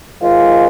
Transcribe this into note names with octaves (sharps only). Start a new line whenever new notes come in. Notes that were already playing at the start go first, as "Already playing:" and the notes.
G#2 D#3 G#3 F4